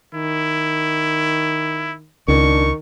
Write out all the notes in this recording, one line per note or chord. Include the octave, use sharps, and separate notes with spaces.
D#3 E4
C#2 D#3 D4 C#6